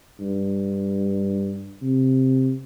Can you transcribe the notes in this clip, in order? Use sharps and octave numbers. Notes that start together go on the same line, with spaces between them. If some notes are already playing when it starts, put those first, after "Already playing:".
G2
C3